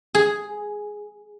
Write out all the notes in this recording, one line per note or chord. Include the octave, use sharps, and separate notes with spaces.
G#4